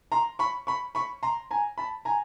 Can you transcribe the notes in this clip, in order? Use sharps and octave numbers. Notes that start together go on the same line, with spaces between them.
A#5 C6
B5 C#6
B5 C#6
B5 C#6
A#5 C6
G#5 A#5
A5 B5
G#5 A#5